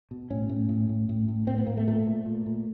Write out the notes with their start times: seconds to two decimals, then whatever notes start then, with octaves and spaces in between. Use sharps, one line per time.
0.11 B2
0.30 A2 C#4
0.49 A2
0.69 A2
0.89 A2
1.09 A2
1.28 A2
1.47 A2 C4
1.58 B3
1.67 A2 A#3
1.77 A3
1.87 A#2 A3
2.06 A#2
2.26 A#2
2.46 A#2